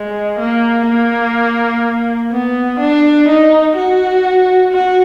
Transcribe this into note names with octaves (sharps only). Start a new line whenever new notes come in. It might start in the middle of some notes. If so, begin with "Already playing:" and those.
Already playing: G#3
A#3
A#3
B3
D4
D#4
F#4
F#4